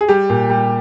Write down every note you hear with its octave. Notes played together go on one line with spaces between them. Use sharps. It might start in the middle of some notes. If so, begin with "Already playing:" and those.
G#4
G3 G4
A#2
G3